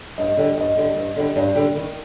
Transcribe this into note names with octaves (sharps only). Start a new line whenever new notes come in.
G2 D#5
D3 G3
G2 D#5
D3 G3
G2
D3 G3
G2 D5
D3 G3
D#3